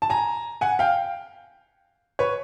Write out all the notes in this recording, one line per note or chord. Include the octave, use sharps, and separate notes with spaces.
A5
G#5 A#5
F#5 G#5
F5 G5
B4 C#5